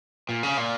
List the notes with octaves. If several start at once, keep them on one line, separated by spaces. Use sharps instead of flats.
A#2
C#3
A#2